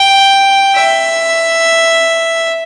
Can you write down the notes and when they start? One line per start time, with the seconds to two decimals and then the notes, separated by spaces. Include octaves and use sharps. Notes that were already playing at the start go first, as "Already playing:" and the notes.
Already playing: G5
0.74 E5